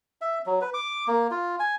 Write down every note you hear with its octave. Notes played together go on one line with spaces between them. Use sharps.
E5
F#3
B4
D6
A#3
F4
G#5